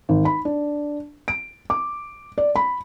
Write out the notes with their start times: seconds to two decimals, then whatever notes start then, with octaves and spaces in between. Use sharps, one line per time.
0.09 G#1
0.25 B5
0.45 D4
1.28 D7
1.70 D6
2.38 D5
2.56 B5